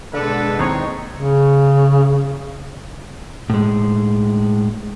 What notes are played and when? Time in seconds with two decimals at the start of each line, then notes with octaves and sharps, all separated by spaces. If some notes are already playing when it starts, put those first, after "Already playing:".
0.13 B2 D3 G#3 D4 A4 B4
0.59 D#2 A2 C4 D#4 C#5
1.16 C#3
3.50 A2 G#3